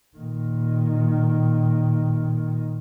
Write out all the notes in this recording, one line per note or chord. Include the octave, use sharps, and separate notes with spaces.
A#2 D#3